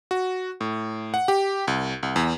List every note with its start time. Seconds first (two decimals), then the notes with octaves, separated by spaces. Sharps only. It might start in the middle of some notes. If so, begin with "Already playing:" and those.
0.11 F#4
0.61 A2
1.14 F#5
1.28 G4
1.68 C2
2.03 C2
2.16 E2